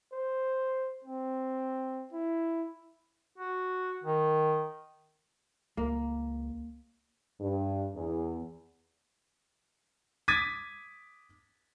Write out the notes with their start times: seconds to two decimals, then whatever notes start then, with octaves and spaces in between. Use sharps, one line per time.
0.13 C5
1.04 C4
2.13 E4
3.38 F#4
4.04 D#3
5.77 C#2 A#3
7.41 G2
7.95 E2
10.28 D6 D#6 G#6 A6 B6 D#7